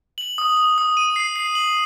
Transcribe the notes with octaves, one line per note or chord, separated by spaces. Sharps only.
F#7
D#6
D#6
D#6
D#7
C7
C7
F#7